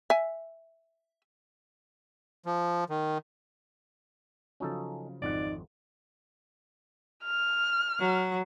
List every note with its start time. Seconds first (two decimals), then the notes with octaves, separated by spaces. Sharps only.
0.10 E5 G#5
2.46 F3
2.89 D#3
4.60 C#3 F3 F#3 C#4 D#4 A4
5.22 G#1 F2 D#4 D5 F#5
7.24 F6
8.00 F#3